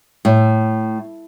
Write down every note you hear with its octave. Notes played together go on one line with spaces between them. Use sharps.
A2